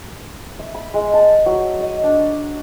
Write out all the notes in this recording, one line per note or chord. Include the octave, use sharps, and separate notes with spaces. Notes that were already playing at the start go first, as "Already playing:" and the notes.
E5
B5
G#3
A5
F#3
D#5
D4